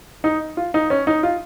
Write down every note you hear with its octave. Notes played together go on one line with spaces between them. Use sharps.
D#4
F4
D#4
C#4
D#4
F4